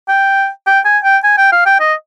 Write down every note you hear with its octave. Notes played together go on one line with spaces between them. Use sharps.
G5
G5
G#5
G5
G#5
G5
F5
G5
D#5